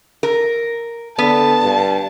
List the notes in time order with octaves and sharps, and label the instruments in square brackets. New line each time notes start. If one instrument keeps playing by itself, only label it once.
[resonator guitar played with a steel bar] A#4
[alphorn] D3 [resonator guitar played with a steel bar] B3 [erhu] A5
[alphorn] G2